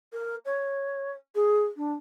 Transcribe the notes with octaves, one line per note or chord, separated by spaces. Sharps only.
A#4
C#5
G#4
D4